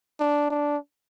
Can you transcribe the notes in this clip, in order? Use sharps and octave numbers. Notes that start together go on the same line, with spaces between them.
D4
D4